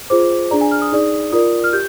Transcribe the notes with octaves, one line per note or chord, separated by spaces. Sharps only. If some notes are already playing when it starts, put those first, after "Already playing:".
F4 G#4 C5 D6
D4 G#4 D5 A#5
G#5
F6
D#6
D#4 G#4 D5
F4 A#4 D5 D#6
F6
G4 G6